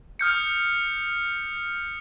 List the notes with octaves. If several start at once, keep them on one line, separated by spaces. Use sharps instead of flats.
D#6 F6 G6 C#7